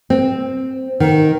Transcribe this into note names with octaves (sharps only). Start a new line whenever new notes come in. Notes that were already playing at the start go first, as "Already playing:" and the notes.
C4
D#3